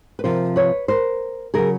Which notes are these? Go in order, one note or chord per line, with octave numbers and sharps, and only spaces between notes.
B4
C3 F3 A#4 C5
B4 C#5
A#4 C5
C#3 F#3 G#4 A#4